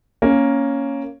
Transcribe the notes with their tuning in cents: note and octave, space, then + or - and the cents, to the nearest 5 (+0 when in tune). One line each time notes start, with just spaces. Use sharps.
A#3 +0 C#4 +0